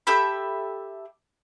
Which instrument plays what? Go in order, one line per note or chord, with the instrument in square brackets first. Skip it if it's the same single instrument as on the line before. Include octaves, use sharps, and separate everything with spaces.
[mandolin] G4 A4 E5 B5